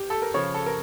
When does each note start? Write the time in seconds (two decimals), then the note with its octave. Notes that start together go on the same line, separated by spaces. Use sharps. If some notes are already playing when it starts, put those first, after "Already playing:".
Already playing: G4
0.10 A4
0.22 A#4
0.34 C#3 F3 C#5
0.54 A4
0.66 A#4